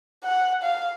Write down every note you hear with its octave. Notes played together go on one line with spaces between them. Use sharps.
F#5
F5